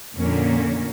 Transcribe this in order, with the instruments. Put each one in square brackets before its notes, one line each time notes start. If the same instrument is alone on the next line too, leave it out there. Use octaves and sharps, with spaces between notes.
[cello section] F2 A#2 D3 A#3 C#4